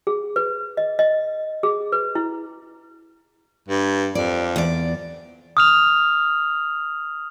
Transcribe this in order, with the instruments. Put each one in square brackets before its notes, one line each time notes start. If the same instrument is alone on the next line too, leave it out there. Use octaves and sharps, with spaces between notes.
[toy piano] G#4
B4
D#5
D#5
G#4
B4
E4
[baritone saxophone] G2
[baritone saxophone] F2 [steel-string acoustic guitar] D5
[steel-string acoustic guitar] E2 D5
[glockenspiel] D#6 F6 F7